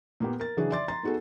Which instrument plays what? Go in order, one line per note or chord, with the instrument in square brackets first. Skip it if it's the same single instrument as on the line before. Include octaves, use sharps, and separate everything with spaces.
[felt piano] A#2 A#3 B3 G4
A#4 A6
C#3 E3 F#3 D4 F#4 G#4
D5 E5 C6 D6 A6
A#5 C6 A6
B3 D#4 F#4 G#4 A4